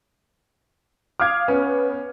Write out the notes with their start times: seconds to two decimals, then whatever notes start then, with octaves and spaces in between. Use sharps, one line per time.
1.20 F5 D6 D#6 F6 G#6
1.48 B3 C#4